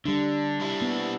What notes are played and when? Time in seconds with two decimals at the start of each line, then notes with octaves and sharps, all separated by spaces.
0.05 D3 G3 D4
0.60 G3 E4
0.81 A#3 B3